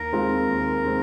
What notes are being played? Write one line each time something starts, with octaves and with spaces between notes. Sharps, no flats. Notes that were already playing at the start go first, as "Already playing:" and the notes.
Already playing: D#2 A#4
D#3 G#3 C4 F4
D#2
D#3 G#3 C4